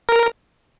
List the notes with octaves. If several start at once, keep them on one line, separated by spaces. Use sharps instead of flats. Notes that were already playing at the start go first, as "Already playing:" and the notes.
A#4